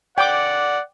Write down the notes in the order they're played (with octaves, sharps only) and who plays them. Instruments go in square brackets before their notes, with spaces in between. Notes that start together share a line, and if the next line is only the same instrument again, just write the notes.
[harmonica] D5 F#5 [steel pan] G5 D6